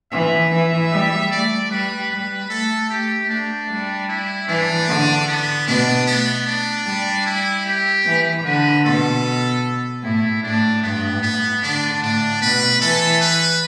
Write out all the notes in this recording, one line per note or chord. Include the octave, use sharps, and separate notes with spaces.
E3 E5
E3
G3
A3 D5
G3 B4
G3 B4
A3 A4
A3 G4
A3 D4
G3
E4
E3 D4
D3
B3
B2 D4
A3 B3
D4
G3
E4
G4
E3
D3 B4
B2 A4
A2 E4
A2 D4
G2 B3
A2 B3
D3 D4
A2 D4
B2 B4
E3 A4
B4